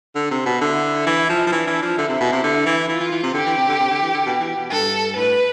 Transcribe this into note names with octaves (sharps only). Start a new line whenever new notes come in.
D3
C3
B2
D3 E4
E3
F3
F3
E3 D4
E3
F3
D3 E4
C3
B2
C3
D3
E3
E3 F4
E3
E3
C3
D3 G4
E3
C3
D3
C3
D3
E3
D3
B2
E3
B2
G2 A4
A2 B4